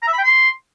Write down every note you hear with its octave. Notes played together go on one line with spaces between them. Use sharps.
A#5
E5
B5
G5
C6